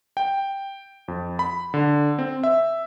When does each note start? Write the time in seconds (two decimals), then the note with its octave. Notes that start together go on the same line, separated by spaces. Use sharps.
0.17 G5
1.08 F2
1.39 B5
1.74 D3
2.19 C4
2.44 E5